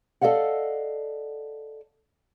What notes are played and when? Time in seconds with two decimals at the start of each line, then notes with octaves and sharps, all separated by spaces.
0.21 A4 D5 D#5 F5 F#5